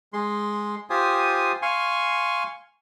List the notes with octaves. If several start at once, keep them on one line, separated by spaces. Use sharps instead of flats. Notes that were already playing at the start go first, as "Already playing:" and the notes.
G#3 C6
F4 G4 C5 G#5 D#6
F5 G#5 C6 C#6